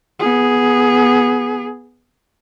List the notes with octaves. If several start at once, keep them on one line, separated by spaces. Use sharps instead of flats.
B3 G#4